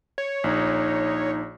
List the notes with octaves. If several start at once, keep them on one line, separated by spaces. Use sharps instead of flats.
C#5
A#1 D#4